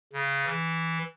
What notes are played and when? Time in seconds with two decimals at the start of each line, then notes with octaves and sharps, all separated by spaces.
0.13 C#3
0.46 E3